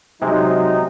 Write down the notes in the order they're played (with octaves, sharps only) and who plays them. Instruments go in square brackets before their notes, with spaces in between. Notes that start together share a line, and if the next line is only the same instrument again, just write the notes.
[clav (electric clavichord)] C3 G#3 [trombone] F#3 [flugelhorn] D#4